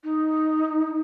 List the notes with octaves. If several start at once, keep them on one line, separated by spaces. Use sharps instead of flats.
D#4